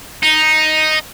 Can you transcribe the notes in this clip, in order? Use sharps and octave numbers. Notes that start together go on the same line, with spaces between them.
D#4